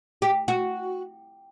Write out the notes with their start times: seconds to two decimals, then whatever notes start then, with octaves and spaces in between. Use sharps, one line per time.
0.22 G4
0.48 F#4